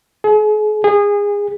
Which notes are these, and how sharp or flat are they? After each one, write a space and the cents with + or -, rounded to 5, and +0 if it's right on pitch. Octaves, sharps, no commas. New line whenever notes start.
G#4 +40
G#4 -25